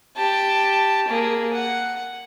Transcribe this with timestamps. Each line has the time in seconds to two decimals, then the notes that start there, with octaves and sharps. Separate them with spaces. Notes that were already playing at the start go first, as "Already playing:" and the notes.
0.17 G4 A5
1.08 A#3 G#4
1.53 F#5